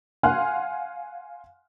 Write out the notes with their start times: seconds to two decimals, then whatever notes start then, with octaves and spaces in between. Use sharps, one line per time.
0.23 F5 F#5 G#5 C6 F6 F#6